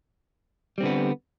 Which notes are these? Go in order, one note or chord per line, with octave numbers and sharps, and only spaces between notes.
D3 G3 B3 C4